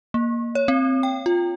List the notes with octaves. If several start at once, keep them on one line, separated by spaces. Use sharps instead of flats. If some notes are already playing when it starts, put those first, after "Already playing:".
A#3
C#5
C4
G5
F4